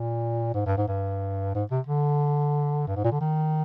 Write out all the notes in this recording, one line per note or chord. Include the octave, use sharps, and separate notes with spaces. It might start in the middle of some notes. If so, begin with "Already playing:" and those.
Already playing: A#2
G#2
G2
G#2
G2
G#2
C3
D3
G2
G#2
A#2
D3
D#3